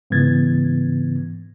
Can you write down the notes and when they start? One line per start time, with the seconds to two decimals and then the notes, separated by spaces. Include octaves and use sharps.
0.10 G#2 C#3 E3 B3 G#6 A6